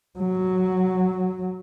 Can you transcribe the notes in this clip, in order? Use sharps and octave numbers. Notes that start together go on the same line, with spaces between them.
F#3